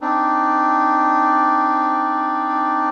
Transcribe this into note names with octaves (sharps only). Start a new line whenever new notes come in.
C4 D4 D#4